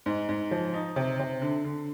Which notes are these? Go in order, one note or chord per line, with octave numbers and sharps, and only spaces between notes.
G#2
G#2
F3
D#4
C3
C3
D3
D3